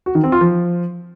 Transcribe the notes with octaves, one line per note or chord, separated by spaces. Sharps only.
F#4
D#3
C4
F4
F3